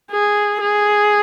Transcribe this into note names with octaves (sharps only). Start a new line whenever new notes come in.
G#4
G#4